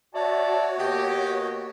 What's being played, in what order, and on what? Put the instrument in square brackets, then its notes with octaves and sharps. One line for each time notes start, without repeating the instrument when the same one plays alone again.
[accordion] F#4 C#5 [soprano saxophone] D5 [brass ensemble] E5 A5
[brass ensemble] B2 A#3 [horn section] G4 [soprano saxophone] D#5